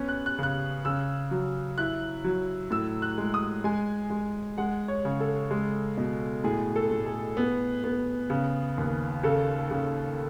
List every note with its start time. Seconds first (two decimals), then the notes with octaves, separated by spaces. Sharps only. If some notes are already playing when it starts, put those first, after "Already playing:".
Already playing: B3 C#4
0.08 F#6
0.26 F#6
0.39 C#3 F#6
0.85 C#3 E6
1.31 F#3
1.78 E4 F#6
2.24 F#3
2.71 A2 E6
3.02 F#6
3.18 G#3
3.34 D#6
3.64 G#3 G#5
4.10 G#3
4.58 G#3 F#5
4.88 C#5
5.05 C#3
5.20 A4
5.51 G#3
5.97 B2
6.44 A2 G#4
6.76 A4
6.91 A2
7.06 G#4
7.37 B3
7.84 B3
8.30 C#3
8.78 D#2
9.23 C#3 A4
9.71 C#3